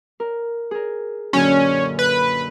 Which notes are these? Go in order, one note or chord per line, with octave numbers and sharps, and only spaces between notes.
A#4
G#4 A#4
F#2 A#2 D3 C#4
B4